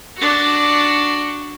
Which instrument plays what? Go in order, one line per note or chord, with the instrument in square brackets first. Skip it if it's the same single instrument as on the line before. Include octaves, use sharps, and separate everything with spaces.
[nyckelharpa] D4 F#4